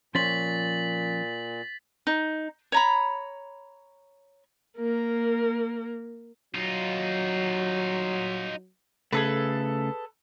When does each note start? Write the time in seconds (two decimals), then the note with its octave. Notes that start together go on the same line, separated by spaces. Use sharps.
0.15 A#2 F3 C#4 C6 A6 B6 F#7
2.07 D#4
2.72 C#5 A#5 B5
4.77 A#3 A#4
6.55 F#3 D#4 F4
9.13 C#3 A3 G#4 A4 B4